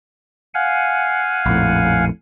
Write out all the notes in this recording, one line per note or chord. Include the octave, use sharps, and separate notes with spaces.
F5 F#5 G#5
A#1 F2 A2